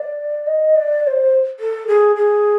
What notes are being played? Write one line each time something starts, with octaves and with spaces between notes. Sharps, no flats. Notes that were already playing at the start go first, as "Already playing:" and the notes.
Already playing: D5
D#5
D5
D5
C5
A4
G#4
G#4